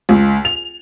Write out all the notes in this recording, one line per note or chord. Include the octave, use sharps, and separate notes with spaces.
C#2
F7